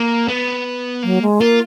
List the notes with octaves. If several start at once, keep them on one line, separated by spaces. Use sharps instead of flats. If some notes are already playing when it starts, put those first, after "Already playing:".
Already playing: A#3
B3
F#3 A#3
G#3
A#3 F4